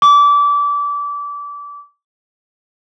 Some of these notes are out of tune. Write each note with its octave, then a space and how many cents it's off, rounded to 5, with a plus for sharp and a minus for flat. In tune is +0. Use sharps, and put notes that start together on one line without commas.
D6 -25